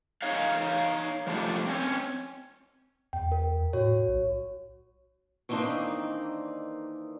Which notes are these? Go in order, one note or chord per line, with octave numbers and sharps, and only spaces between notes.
D#4 C#5 F5
F3 G3 A3 D4
C4 C#4
E2 G5
A#4
A2 F#4 C#5
B1
D#3 E3 A#3 C4 D4 D#4